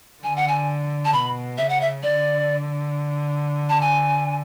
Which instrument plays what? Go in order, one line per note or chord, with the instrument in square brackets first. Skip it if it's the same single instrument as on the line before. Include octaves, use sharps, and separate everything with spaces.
[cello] D3 [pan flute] G#5
[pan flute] F#5
G#5
A5
[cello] B2 [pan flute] B5
[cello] C#3 [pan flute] E5
[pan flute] F#5
E5
[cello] D3 [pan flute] D5
[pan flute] A5
G#5